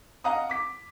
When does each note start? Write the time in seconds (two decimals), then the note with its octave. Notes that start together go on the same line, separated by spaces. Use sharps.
0.24 D#5 F5 F#5 A#5 D#6
0.49 D6 B6